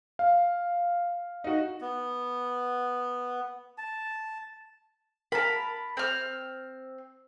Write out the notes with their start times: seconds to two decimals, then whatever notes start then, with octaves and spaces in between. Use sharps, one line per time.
0.19 F5
1.44 D#4 F#4
1.81 B3
3.78 A5
5.32 A#4 A5 B5
5.97 C4 F6